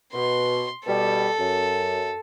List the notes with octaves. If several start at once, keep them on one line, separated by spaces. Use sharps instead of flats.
B2 C6
B2 G3 A4
F#2